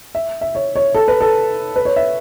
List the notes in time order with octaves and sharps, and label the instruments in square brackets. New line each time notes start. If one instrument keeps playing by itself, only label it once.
[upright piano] E5
E5
C#5
C#5
A4
B4
A4
B4
C#5
E5